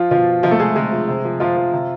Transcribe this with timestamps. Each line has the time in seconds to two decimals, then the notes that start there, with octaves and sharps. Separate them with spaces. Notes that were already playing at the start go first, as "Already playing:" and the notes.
Already playing: F3 F4
0.11 B2 F3 F4
0.43 C3 F3 F4
0.51 A3 A4
0.59 F3 G#3 G#4
0.76 C3 G#3 G#4
0.92 F3
1.08 C3
1.25 F3
1.40 C3 F3 F4
1.57 F3
1.73 C3